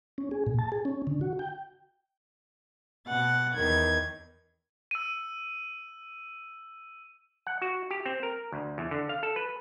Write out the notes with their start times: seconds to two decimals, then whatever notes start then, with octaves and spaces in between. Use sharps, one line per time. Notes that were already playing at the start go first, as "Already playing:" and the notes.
0.18 C#4
0.31 G#4
0.46 A#2
0.59 A5
0.72 G#4
0.85 C#4
1.07 D3
1.21 F#4
1.39 G5
3.07 B2 F#5 A6
3.54 E2 D#3 G#6
4.91 E6 D#7
7.47 F#5
7.62 F#4
7.91 G4
8.06 C4
8.23 A#4
8.52 D2
8.78 E2
8.91 D3
9.09 F5
9.23 A4
9.36 B4